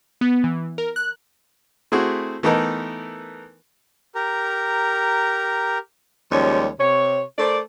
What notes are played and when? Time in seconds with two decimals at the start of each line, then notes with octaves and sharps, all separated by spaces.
0.21 B3
0.44 E3
0.78 A#4
0.96 F#6
1.92 A3 C4 E4 F#4 G#4
2.43 E3 A3 B3 D#4 A4 A#4
4.15 G4 A#4 A#5
6.31 D#2 F3 G3 G#3 C#4 C#5
6.79 C3 C#5
7.39 A3 A#4 C5 D5